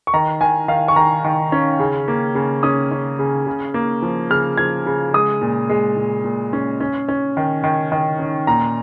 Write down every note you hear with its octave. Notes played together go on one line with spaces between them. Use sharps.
C#6
D#3 A#5
D#3 G#5
D#3 F5
C#6
D#3 A#5
D#3
C#4
C#3
A#3
C#3
C#4 D#6
C#4
C#3
C#3
A#3
F3
C#3 F6
F3 G#6
C#3
G#3 D#6
A#2
G#3
A#2
A#2
C#4
C#4
C#4
D#3
D#3
D#3
C#4
A#2 A#5